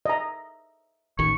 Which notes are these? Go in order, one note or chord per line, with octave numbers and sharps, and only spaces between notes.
D#5 E5 A#5
A1 D#3 C#6